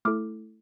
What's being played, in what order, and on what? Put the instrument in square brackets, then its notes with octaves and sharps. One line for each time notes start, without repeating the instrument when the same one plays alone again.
[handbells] A3 E4 A4 D6 F6